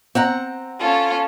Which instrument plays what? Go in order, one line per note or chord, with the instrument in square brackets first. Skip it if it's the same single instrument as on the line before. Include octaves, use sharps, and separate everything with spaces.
[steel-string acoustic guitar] C4 F#5 A#5
[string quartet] C#4 F4 A4